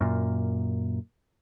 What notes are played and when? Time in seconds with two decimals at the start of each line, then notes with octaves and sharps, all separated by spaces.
0.01 F#2 A#2